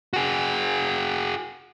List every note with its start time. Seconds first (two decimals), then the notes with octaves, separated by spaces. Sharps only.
0.13 F#4 G#4